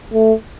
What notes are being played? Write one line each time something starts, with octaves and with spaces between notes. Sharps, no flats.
A3